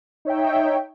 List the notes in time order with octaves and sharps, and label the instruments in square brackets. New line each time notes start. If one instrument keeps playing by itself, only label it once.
[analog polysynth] D#4 C#5 E5 G5